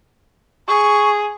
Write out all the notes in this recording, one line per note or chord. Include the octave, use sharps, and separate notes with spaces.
G#4 C#6